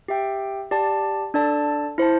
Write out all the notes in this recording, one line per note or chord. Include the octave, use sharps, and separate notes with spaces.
G4 E5 G5
G4 D5 A5
D4 A4 D5 A5
E4 C5 A5